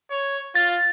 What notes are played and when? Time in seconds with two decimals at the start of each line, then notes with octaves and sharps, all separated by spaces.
0.10 C#5
0.55 F4 A6